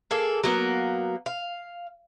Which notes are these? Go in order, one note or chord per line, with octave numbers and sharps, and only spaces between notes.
A#3 G#4 A4
F#3 A#3 B3
F5